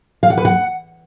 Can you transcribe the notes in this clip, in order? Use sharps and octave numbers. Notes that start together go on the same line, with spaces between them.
F5
F#5
B4
F#5